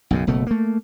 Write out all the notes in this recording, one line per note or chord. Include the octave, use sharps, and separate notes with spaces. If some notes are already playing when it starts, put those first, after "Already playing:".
B1 F#2 C#3
F#1 B2 A3
A3 A#3